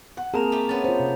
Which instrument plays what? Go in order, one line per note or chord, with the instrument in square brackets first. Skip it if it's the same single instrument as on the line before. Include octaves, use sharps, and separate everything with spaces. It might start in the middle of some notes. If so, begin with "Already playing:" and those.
[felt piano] F#5
[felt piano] A#3 C4 A#4 [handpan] G#4 [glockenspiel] A5 A#5 F7
[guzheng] A3 G4
[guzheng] B3 C#4 [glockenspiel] A6
[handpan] F4 C5
C3